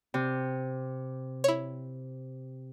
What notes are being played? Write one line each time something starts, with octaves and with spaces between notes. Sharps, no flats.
C3
E4 C#5